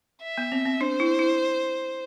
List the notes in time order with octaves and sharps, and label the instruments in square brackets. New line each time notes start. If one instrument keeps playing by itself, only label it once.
[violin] E5
[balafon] B3
C4
C4
[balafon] D4 [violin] C5
[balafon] E4
E4